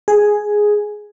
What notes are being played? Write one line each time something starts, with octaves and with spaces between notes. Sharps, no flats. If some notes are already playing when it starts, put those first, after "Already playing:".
G#4